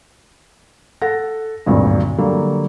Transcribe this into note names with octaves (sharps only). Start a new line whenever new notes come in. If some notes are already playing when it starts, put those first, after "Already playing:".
A4 F#5 A#6
G#1 D2 G2 A#2 F#3
D3 F#3 G3 A#3